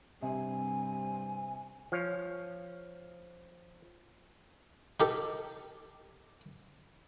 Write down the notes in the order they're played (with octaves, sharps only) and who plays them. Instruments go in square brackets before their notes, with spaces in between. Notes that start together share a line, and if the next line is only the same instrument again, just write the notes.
[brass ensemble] G2 G3 C4 [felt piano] C3 [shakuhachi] G#5
[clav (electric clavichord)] F3 C#5
[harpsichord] D#4 G4 A4